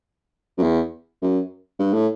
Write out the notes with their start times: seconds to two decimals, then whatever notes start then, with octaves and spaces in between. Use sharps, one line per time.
0.58 F#2
0.63 E2
1.22 F#2
1.79 G2
1.94 A2